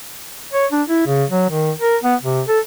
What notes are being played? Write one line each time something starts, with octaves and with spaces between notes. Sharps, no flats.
C#5
D4
E4
C#3
F#3
D#3
A#4
B3
C3
A4